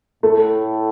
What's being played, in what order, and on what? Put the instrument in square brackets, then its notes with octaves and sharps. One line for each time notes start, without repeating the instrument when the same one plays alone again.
[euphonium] A2 [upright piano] A3